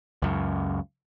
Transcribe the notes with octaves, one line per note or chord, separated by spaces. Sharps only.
C#2 F#2